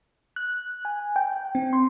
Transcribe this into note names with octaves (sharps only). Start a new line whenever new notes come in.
F#6
G#5
G5
C4
C6